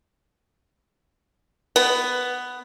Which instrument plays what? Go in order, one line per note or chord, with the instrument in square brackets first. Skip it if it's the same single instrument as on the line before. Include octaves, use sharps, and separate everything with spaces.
[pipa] B3